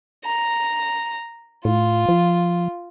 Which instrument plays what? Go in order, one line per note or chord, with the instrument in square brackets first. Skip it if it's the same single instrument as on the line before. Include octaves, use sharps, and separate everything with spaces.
[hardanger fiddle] A#5
[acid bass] A2 [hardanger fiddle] F4
[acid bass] F3